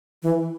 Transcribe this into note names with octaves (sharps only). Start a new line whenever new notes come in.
E3